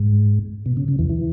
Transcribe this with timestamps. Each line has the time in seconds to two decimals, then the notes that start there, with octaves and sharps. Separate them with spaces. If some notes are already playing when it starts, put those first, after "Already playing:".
Already playing: G#2
0.66 B2
0.77 C#3
0.88 C#3
0.99 E2 E3
1.09 E3